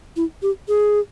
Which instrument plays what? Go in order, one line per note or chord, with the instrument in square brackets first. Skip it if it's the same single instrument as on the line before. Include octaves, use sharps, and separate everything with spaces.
[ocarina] E4
G4
G#4